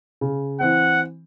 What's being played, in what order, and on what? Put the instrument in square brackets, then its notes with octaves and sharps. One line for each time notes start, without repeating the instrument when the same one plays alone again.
[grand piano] C#3
[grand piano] E3 C4 [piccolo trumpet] F#5